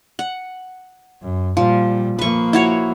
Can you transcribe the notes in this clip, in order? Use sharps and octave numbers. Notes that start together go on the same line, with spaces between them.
F#5
F#2
A#2 F3 G3
F3 A#3 B4 C#6
E4 F#4 C#5